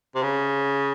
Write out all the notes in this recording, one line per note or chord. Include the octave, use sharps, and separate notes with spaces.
C3
C#3